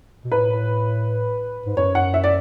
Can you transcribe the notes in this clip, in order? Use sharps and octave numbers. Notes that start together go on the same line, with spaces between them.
B2
A2 B4
G#2
F#2 C#5
F#5
E5
D5